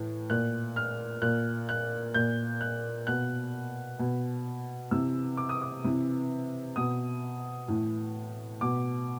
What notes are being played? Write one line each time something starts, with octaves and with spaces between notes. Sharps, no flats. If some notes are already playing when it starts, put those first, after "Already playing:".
Already playing: A2 E3
A#2 F#6
F6
A#2 F#6
F#6
A#2 G6
F#6
B2 F#6
B2
C3 E3 E6
D6
D#6
D6
C3 E3
B2 D#6
A2 E3
B2 D6